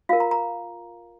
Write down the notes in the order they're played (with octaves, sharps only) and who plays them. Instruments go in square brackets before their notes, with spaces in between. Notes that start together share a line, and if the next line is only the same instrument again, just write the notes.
[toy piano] F4 A#4 F5
A#5
A#5